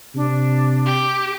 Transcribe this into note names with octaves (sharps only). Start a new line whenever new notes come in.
C3 D4
G4